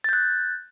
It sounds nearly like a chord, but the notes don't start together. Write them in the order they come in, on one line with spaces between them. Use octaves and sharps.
A6 G6 F#6